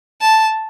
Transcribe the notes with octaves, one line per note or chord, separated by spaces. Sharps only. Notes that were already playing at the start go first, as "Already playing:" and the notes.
A5